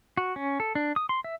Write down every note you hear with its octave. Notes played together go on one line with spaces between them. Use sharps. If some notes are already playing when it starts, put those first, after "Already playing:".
F#4
C#4
A4
D4
D#6
C6
E5